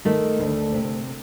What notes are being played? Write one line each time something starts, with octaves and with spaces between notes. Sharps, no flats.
D#3 A3
D2
C3